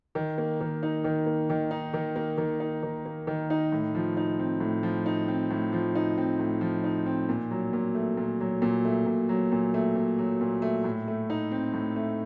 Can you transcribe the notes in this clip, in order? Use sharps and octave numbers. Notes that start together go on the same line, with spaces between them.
D#3
A#3
D#3
D#4
D#3
A#3
D#3
D#4
D#3
A#3
D#3
D#4
D#3
A#3
D#3
D#4
A2
F3
D#4
C4
A2
F3
D#4
C4
A2
F3
D#4
C4
A2
F3
D#4
C4
A#2
F#3
A#2
A3
A#2
F#3
A#2
A3
A#2
F#3
A#2
A3
A#2
F#3
A#2
A3
A2
A3
D#4
C4
A2
A3